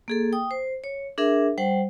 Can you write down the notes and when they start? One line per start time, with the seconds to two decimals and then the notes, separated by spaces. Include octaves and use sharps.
0.08 A#3 G#4 A4
0.32 G5 D#6
0.51 C5
0.84 C#5
1.18 D4 G#4 A#4 E5
1.58 G3 C5 F#5 G5